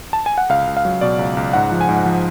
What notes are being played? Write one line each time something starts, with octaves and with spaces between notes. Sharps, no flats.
A5
G#5
F#5
C#2 F5
C#2
F5
F#3
B2 D5
C#2
C#2
G#2 F#5
F3
G#5
G#2
F3